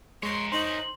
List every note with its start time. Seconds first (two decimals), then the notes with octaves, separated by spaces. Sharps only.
0.23 G#3 A#4 C#5 C6
0.52 D#4 C5 C6 F#7